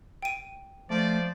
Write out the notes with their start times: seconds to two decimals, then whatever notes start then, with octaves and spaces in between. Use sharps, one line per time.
0.22 G5 D#7
0.90 F3 A3 C5 D5